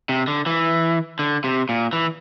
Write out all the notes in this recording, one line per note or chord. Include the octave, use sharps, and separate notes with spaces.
C3
D3
E3
D3
C3
A#2
E3